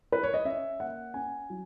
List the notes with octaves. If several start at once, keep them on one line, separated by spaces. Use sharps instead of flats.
B4
C#5
D#5
C#4 E5
A#3 F#5
C#4 G#5
F#3